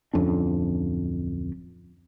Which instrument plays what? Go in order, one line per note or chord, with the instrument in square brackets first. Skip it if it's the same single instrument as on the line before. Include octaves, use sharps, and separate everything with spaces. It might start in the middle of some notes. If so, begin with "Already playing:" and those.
[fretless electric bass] D1 F2 C#4 D4